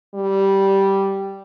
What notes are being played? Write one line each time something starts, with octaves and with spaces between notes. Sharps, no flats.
G3